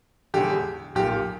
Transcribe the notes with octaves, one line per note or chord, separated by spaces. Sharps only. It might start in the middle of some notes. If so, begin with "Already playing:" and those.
E1 E2 D3 G4
B1 A#2 G4